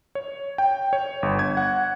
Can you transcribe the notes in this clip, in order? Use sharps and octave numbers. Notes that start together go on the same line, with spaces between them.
C#5
G5
C#5
G1
G#6
F#5